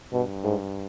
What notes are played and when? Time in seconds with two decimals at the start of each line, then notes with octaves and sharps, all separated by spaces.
0.12 G2 B2
0.44 G#2